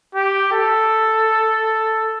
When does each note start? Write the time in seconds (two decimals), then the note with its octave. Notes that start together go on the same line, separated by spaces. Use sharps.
0.15 G4
0.52 A4